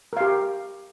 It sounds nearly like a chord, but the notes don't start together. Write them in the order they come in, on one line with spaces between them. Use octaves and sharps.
A#4 F5 G4